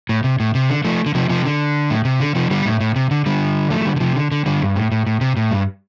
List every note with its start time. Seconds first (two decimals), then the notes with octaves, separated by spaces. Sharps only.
0.09 A2
0.24 C3
0.40 A2
0.55 C3
0.70 D3
0.84 F3 A3
1.06 D3
1.15 C3 F3
1.30 C3 F3
1.45 D3
1.90 A2
2.05 C3
2.20 D3
2.35 C3 F3
2.51 D3 G3
2.66 A2
2.80 A2
2.96 C3
3.11 D3
3.26 D3 G3
3.70 F3 A3
3.81 F3
3.85 D3 G3
3.96 D3
4.00 C3 F3
4.16 D3
4.32 D3
4.46 D3 G3
4.62 G2
4.76 A2
4.92 A2
5.07 A2
5.21 C3
5.37 A2
5.51 G2